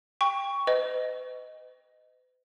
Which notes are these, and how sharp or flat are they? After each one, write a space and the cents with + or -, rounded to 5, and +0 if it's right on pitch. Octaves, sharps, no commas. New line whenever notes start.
G5 +20 C#6 +10
B4 +45 D#5 +0